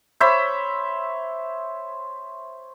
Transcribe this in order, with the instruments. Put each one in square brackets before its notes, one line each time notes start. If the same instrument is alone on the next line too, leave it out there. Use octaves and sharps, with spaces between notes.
[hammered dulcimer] C5 C#5 E5 B5